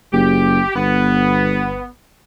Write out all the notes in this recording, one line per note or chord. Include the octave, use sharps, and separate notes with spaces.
F#1 G4
G1 B3